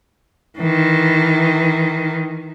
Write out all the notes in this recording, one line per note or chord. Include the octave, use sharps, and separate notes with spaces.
D#3 E3